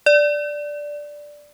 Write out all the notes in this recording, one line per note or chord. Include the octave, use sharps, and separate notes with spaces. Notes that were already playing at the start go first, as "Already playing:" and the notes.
D5